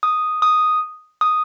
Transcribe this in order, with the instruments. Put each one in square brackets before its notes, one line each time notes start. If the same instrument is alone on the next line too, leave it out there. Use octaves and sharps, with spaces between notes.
[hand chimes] D#6
D#6
D#6